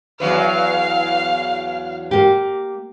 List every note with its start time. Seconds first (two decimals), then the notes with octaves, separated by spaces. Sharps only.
0.20 E2 F#3 B4 F5
2.11 A#3 G4